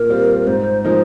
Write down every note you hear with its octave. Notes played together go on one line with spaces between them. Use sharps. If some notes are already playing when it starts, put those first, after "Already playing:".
Already playing: A#2 A#4
G3 C4 F4
G#2 C5
F3 G#3 D#4 A#4